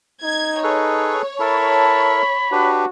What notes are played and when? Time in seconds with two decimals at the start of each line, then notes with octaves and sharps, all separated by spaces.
0.23 D#4 G#6
0.64 G#4 A4 B4 C#5
1.40 E4 A4 A#4 A5 B5
2.52 D4 F#4 G4 B4